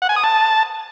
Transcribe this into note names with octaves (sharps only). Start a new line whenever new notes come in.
F#5
G#5
D#6
A5